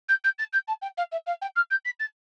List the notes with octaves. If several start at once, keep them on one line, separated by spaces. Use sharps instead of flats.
G6
G6
A6
G6
A5
G5
F5
E5
F5
G5
F6
G6
B6
A6